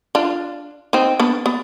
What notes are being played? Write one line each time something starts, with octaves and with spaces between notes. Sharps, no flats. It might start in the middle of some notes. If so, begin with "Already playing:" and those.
D4 F4
C4 D#4
B3 D4
B3